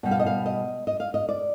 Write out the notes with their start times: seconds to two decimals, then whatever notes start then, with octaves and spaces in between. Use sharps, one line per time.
0.03 B2 G3
0.11 F5
0.20 D#5
0.26 F5
0.46 D#5
0.87 D#5
1.00 F5
1.14 D#5
1.29 D5